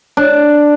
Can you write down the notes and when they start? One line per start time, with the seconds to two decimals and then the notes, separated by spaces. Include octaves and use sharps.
0.17 D4